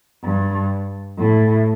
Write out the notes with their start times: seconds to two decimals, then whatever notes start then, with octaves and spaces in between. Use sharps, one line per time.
0.23 G2
1.18 A2